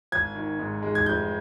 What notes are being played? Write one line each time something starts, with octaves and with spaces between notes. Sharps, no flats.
G#1 G#6
D#3
G#2
G#3
G#6
F1 G6